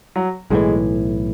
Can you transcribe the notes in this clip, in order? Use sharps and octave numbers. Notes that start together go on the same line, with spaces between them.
F#3
B1 A2 E3 G#3